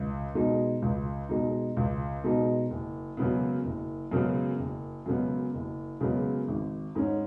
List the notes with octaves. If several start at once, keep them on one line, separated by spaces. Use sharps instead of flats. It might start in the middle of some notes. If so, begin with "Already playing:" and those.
Already playing: C#2
B2 G#3 D#4
C#2
B2 G#3 D#4
C#2
B2 G#3 D#4
F#1
F#2 C#3 G#3 B3
F#1
F#2 C#3 G#3 B3
F#1
F#2 C#3 G#3 B3
F#1
F#2 C#3 G#3 B3
G#1
G#2 G#3 C#4